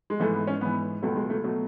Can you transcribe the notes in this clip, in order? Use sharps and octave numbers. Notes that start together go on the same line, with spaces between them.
G#3
G#2 E3 A3
B3
C#4
G#2 E3 B3
C#2 B2 F#3 A3
G#3
A3
B2 F#3 A3